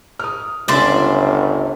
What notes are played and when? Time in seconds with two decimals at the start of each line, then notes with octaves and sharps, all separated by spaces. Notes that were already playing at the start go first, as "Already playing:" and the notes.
0.19 D#6 F6
0.68 G1 C#2 C#4 D5 E5 C6